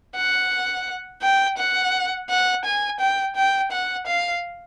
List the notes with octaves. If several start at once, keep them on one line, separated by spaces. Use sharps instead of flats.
F#5
G5
F#5
F#5
G#5
G5
G5
F#5
F5